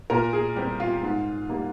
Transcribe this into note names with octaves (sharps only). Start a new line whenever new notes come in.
A#2 A#4
G#4
G3 C4 G4
F4
G#2
G3 A#3